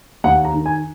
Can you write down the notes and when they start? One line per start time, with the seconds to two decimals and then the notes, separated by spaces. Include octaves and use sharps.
0.24 D#2 F#5
0.45 A#5
0.54 D#3
0.66 G#5